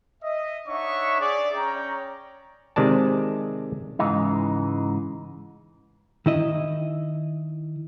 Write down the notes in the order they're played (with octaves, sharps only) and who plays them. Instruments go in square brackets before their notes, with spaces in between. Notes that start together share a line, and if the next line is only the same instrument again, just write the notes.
[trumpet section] D#5 E5
D4 D#4 C#5 E5 F#5 C#6
G#4 D5 D6
C#4 C#5 G5 A#5
[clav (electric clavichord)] C3 D#3 G#3 D5 A5
[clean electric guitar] G#2 C#3 E3 G#3 D#4
[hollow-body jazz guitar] D#3 E4 D#5